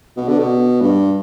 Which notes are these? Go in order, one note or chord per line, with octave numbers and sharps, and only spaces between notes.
B2
D3
B2
G2